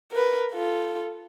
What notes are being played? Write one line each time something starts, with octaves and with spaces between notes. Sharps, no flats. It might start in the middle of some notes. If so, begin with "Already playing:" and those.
A#4 B4
F4 A4